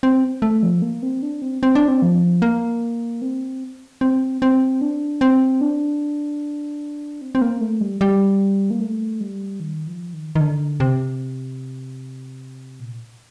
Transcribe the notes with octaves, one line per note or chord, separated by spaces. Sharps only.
C4
A3
F3
A#3
C4
D4
C4
C4
D4
C4
F3
A#3
C4
C4
C4
D4
C4
D4
C4
C4
A#3
A3
G3
G3
A#3
A3
G3
D#3
F3
D#3
D#3
D3
C3
A#2